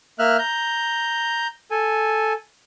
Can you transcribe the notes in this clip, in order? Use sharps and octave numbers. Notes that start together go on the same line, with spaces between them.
A#3 E5 F6 F#6
A#5 G6
A4 G#5